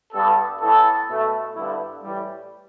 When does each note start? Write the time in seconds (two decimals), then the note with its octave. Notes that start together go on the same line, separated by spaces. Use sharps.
0.13 G2 G3 B3 A4
0.61 A2 E3 B3 A4
1.08 B2 A3
1.56 G2 D3 G3 B3 E4
2.03 A2 E3 G3